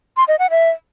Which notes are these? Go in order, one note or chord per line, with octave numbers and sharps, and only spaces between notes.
C6
D#5
F#5
E5